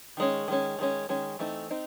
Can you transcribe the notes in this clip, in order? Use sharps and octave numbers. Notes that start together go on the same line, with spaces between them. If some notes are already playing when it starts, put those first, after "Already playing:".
D#3 G#3 C#4
D#3 G#3 C#4
D#3 G#3 C#4
D#3 G#3 C#4
E3 A3 C4 D#4
C4 D#4